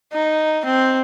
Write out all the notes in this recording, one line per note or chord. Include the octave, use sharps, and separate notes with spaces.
D#4
C4